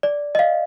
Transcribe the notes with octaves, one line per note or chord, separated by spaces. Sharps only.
D5
D#5
F5